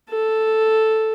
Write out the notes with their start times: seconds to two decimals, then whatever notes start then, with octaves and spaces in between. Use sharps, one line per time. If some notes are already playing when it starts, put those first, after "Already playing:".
0.11 A4